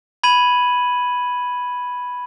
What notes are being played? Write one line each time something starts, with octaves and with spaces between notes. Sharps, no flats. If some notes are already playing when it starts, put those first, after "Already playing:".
B5 G#6 D#7 F#7